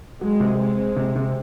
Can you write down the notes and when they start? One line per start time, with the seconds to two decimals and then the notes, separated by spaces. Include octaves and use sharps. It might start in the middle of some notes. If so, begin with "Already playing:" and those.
0.21 F#3 G#3
0.40 C3
0.59 G#3 C4
0.77 C4
0.96 C3
1.16 C3